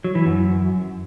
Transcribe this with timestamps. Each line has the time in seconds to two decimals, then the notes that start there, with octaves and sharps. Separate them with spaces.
0.04 F#3
0.15 E3
0.26 F#2